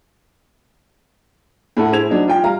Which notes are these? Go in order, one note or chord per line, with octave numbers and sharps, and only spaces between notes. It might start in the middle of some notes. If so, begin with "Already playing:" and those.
A2 A4 F#5
E4 G#4 C5 G#6 F7
F#3 D4 D#4
F4 G5
G3 F5 A#5